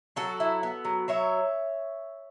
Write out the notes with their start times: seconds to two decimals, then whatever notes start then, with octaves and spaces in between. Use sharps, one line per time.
0.16 F#3 F#4 A4
0.40 E4
0.63 B3
0.85 F#3
1.08 F#3 C#5 E5